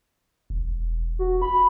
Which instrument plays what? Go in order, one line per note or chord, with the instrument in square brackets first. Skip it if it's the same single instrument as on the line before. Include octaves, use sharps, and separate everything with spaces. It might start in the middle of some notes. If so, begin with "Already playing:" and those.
[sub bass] E1
[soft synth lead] F#4
B5